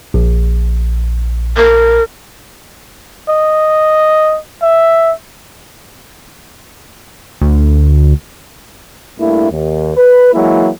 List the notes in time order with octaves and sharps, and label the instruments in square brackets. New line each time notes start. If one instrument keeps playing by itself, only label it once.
[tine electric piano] A#1
[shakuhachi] A#4
[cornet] D#5
E5
[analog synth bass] D2
[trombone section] G2 A3 A#3 E4
D#2
B4
E3 F#3 G#3 A#3 E4